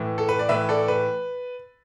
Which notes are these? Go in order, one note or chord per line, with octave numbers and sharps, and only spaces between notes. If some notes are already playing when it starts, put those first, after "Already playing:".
Already playing: A2 E3
A4
B4
D5
A2 E3 B4 E5
A4 D5
B4